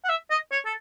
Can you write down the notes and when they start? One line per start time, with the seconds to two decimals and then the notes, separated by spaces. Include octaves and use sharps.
0.04 F#5
0.09 E5
0.30 D#5
0.52 C#5
0.65 A4